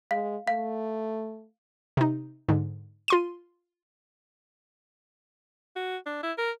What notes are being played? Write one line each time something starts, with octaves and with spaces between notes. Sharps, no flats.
G#3 F5
A3 F5
C3 D#4
G#2 D3
F4 C6 D#7
F#4
D4
E4
A#4